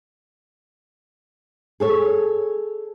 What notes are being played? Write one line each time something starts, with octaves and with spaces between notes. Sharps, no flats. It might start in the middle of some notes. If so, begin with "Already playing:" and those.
G#4 A4 C#5